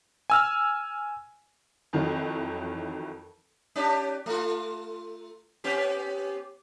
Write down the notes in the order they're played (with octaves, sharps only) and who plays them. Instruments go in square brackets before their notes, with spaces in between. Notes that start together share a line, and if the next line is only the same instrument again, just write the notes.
[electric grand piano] G#5 E6 F6
[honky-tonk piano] F2 D#3 E3 F#3
[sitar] C#4 D4 G4
A3 F4
B3 C#4 G4